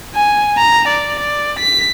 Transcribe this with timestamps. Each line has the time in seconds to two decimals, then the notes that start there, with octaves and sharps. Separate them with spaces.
0.15 G#5
0.58 A#5
0.88 D5
1.19 D5
1.59 B6